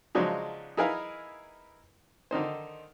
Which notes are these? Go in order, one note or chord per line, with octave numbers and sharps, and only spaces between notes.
C#3 F3 F#3 G#3 D4 D#4
D#4 E4 G#4 A#4 B4 F5
D3 D#3 D#4 C5